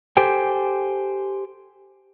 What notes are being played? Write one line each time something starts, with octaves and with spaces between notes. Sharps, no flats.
G4 A4 C5 G5 G#5